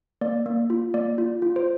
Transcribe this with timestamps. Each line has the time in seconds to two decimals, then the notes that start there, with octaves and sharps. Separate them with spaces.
0.21 A#3 D5
0.46 A#3
0.70 F4
0.94 A#3 D5
1.18 F4
1.42 F4
1.56 C5